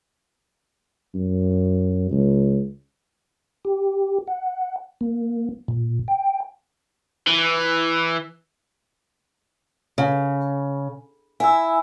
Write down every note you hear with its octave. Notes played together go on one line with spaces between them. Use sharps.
F#2
C#2
G4
F#5
A#3
A#2
G5
E3
C#3
E4 G#5 E6